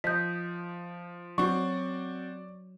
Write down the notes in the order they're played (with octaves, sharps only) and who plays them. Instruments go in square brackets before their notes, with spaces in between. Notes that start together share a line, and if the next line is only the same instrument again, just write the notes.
[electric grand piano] F3 [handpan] D#5 [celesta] G6 B6
[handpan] F#3 [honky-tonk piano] C4 F#4 [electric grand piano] D5 [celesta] C#6